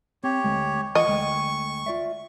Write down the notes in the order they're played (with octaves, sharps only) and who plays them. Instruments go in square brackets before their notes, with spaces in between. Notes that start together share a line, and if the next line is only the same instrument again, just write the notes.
[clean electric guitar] C4 [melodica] G4 C#5
[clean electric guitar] D2 G#3
[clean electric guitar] E3 F4 F#5 [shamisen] D#5 [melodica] C#6
[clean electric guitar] D2 G#3 G5
F4 D5 E5